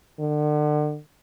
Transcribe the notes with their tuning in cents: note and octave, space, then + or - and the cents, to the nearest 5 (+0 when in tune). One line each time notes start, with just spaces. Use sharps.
D3 +35